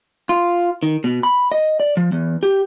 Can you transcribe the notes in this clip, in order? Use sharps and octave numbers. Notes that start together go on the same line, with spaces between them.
F4
D#3
B2
B5
D#5
D5
F3
E2
G4